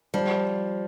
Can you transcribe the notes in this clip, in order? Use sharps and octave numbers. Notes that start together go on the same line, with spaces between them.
F3 G3